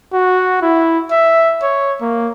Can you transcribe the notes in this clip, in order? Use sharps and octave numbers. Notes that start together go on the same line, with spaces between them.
F#4
E4
E5
C#5
A#3